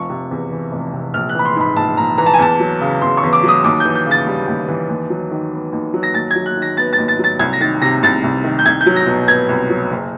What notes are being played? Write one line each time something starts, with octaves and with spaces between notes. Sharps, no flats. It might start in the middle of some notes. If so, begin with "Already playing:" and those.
Already playing: F1 F3 C#6
C3
E2
E3
F1
C3
A#1 F6
F#6
E3 B5
C6
G#2 B5
A#1 A5
A#1 A#5
E3 A#5
A5
G#5
E2 A5
F#3
C#3
E2 C6
C#6
E2
D6
F#3 D#6
D#2 D6
E3 G6
G6
C#3
A6
G3
D#2
E3
D#2
F#3
D#3
B3
D#2
F#3
A#6
D#2 A6
F#3 G#6
F#6
D#3
A#6
B3 A6
A6
D#2
A6
F#3 A6
C2 G#6
A#6
D#3 A6
C3 A#6
C2 A6
C2
D#3
G6
C2 G#6
G6
F#3
A#6
B2
B3 G#6
C2
F#3
F#1